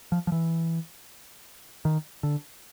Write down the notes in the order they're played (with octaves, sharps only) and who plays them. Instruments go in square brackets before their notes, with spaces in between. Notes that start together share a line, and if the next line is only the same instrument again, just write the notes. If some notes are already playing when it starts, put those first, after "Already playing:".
[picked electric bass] F3
F3
E3
D#3
D3